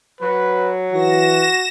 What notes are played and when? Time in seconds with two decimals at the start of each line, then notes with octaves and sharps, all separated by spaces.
0.21 F#3 B4
0.93 E3 F#4 A#6 E7